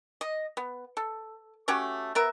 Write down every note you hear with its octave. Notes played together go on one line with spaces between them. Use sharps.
D#5
B3
A4
A3 C#4 F#4 G4
B3 A#4 E5